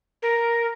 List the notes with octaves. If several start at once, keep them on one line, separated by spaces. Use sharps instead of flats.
A#4